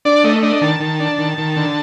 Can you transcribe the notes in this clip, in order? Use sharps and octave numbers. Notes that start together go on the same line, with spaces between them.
D4 D5
A3 D#5
D4 D#5
D#3 A5
D#3
D4
D#3
D#3
D3